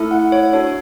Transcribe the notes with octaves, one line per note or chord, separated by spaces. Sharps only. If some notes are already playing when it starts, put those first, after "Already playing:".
Already playing: A3 E4 A4
F#5
C#5
D4 F#4 A4 C#5